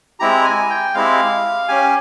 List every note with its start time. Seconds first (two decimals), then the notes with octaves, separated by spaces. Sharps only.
0.20 G#3 C4 E4 G4 A#5
0.44 G#5
0.70 G5
0.94 G#3 C4 E4 G4 F5
1.68 C#4 G4 G#5